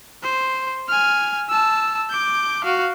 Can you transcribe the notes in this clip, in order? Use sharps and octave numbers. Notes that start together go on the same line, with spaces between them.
C5
G#5 F6
A5 E6
D6 G6
F#4 F5